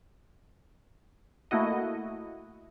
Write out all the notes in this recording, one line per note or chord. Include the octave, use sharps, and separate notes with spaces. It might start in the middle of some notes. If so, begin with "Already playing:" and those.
A3 A#3 E4 F#4 D#5